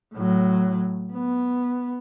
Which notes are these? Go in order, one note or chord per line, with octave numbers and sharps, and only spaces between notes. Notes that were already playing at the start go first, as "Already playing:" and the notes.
A2 F#3
B3